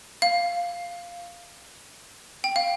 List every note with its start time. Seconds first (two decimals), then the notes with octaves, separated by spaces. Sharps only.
0.22 F5
2.44 G5
2.56 F5